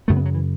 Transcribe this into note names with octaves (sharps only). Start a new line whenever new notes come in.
F#1 F#2 C#3 A3
B3
F#3
E3